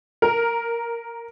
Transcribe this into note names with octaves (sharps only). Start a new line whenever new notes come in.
A#4